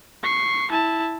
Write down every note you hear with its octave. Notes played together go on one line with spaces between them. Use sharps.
C#6 C7
E4 A5